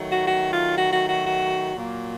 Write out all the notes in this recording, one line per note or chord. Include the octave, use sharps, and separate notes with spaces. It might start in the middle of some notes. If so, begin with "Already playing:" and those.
Already playing: D#3 F#3 A3
F#4
F#4
F4
F#4
F#4
F#4
F#4
A#2 F#3 A#3